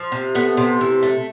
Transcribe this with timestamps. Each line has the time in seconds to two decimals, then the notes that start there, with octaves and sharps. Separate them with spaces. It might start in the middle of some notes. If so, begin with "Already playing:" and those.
Already playing: F3
0.12 C3
0.35 A3 B3
0.57 C3
0.81 E3
1.03 A3